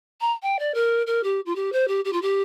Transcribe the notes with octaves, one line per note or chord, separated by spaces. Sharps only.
A#5
G5
D5
A#4
A#4
G4
F4
G4
C5
G4
G4
F4
G4